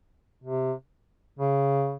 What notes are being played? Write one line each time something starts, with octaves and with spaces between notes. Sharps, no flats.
C3
C#3